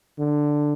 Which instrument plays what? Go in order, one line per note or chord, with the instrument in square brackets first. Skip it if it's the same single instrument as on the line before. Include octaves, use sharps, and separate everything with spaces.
[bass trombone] D3